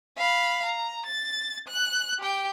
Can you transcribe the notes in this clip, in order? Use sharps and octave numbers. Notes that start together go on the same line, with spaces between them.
F5 B5
A#5
A6
F#6
G4 G5